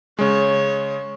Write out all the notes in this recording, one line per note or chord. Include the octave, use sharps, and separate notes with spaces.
C#3 G#3 C#5